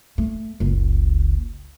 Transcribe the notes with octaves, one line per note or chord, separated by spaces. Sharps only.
A3
F#1 C#2